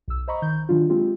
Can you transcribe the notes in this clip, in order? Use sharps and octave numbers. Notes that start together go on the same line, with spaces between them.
B1 E6
C5 D#5 A#5 B5 C#6
D#3 G6
D#3 F#3 D4 F4
G#3 C4 F4 G4